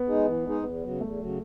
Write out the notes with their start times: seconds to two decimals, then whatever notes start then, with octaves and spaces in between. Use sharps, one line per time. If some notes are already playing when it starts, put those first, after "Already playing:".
Already playing: B3
0.08 G#3 D#4 G#4
0.26 E3
0.46 G#3 D#4 G#4
0.64 E2 B3
0.83 C#3 F#3
1.01 E2 A3
1.20 C#3 F#3